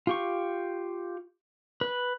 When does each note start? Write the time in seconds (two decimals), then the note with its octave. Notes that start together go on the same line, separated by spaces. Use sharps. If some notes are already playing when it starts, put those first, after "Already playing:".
0.07 F4 G4 C#6
1.81 B4